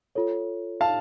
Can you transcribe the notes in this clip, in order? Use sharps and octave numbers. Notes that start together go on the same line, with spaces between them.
F4 A4 C#5
F5 A5